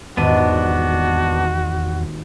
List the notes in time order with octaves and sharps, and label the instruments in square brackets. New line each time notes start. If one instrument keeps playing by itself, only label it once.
[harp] D#1 G#1 D#7 [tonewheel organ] E2 [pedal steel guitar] B3 D4 [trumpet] F#4